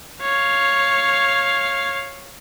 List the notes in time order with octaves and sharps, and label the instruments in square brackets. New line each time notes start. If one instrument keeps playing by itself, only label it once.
[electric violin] C#5 F5